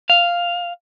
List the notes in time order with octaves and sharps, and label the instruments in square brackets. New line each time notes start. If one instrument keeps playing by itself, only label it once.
[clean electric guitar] F5